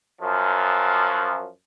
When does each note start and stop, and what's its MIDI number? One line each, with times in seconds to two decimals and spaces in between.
0.21 1.48 42
0.21 1.48 53